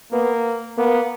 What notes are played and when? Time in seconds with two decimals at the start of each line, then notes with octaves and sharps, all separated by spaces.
0.12 A#3 B3
0.78 A#3 B3